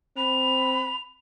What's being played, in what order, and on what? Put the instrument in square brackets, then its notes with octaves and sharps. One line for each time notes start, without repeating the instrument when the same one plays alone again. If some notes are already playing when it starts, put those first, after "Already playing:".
[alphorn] C4 [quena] B5 [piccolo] F7